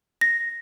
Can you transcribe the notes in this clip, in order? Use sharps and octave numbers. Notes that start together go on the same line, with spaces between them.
A#6